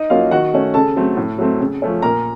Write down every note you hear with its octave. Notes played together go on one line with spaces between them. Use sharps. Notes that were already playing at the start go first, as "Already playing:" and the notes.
Already playing: D#4 D#5
F#3 A#3 C#4 F4 F5
D#3 F#4 F#5
A3 C#4
C#3 A4 A5
F#3 A3 C4
A2
F#3 A3 C4
C#3
F3 A3 C#4
A#2 A#4 A#5